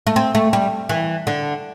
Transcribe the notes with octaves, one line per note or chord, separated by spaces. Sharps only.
A3
C4
A3
G3
E3
D3